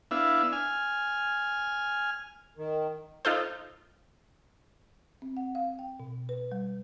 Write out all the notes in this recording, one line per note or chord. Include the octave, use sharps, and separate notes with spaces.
B3 D4 E4 E5 F5
G#5 F6
D#3
D#4 F4 A4 C5
C4
F#5
F5
G5
B2
B4
G3